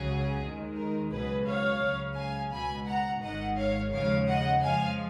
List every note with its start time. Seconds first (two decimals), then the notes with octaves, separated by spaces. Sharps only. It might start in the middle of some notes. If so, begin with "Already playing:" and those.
Already playing: C#2 C#3 F#3 G#4
0.41 D#2 D#3 G#3
0.76 A#4
1.11 C#2 B2 F#3 G#4 B4
1.46 C#5 F5
1.82 C#2 C#3 F#3
2.16 F5 G#5
2.51 C#2 B2 G#3 G#5 B5
2.87 F#5 A#5
3.22 G#1 G#2 D#3 D#5 F#5
3.57 C#5 F5
3.92 D#2 C#3 F3 G#3 C#5 F5
4.28 D#5 F#5
4.63 F2 F3 G#3 F5 G#5